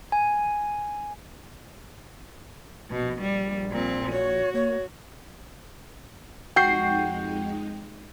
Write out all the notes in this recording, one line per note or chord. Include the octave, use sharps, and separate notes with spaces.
G#5
A#1 B2
G3
A#2 C4
F#4 C#5
A#3 C#5
F2 G#3 D#4 F#4 G5 G6 C7